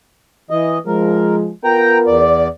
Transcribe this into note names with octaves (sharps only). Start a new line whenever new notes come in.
E3 D#5
F3 G#3 A#4
B3 F4 A#4 G5 A#5
E2 D5